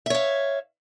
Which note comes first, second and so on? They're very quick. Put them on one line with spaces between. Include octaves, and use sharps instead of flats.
E5 C#5 F5